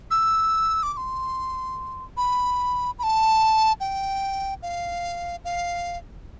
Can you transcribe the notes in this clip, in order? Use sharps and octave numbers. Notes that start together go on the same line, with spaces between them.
E6
D6
D6
C6
B5
B5
A5
G5
F5
F5